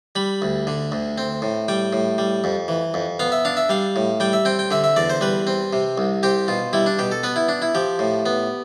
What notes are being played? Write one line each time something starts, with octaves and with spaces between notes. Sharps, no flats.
G3 B5
D2
D3
D2
C4
A2
G3 G5
A2
G3
F2
E3
F2
B3 F5
E5
D4 F5
E5
G3 F5
A2
G3 G5
E5
C4 G5
G5
D3 E5
E5
E2 D5
C5
G3 B4
C4
C3
C2
C4 G4
B2 F4
G3 E4
D4
B2 G4
A4
B3 B4
E4
D4
E4
F3 G4
A2
B3